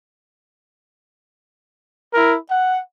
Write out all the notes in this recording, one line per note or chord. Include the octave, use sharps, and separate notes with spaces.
E4 A#4
F#5